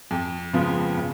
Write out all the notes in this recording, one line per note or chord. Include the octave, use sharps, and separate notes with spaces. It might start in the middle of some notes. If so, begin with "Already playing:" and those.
F2
C#3 F3 G#3 B3
C#3